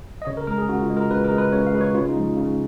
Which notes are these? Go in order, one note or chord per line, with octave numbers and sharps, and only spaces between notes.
D#5
C#3 C#5
A#4
G#3 A#4
G#4
C#3 F#4
F4
G#3
A#4
C#3 B4
A#4
G#3
B4
C#3 C#5
F5
G#3 B4
C#5
C#3 F4
D#4
F3 G#3
C#3